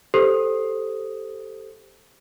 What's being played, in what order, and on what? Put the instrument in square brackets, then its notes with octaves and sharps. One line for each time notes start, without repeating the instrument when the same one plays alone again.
[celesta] G4 A4 C5 D#6